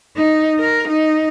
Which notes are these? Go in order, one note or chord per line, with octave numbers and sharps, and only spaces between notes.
D#4
A#4
D#4